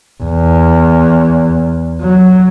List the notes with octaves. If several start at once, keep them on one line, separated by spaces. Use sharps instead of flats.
E2
F#3